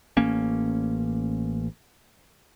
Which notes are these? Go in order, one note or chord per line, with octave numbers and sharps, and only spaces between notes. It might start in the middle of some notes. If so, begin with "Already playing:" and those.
A1 A#3 C#4